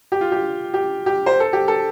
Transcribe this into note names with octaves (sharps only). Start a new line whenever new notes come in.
G4
F4
G4
G4
G4
C5
A4
G4
A4